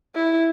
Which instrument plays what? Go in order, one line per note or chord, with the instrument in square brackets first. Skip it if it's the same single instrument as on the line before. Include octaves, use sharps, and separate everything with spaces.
[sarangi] E4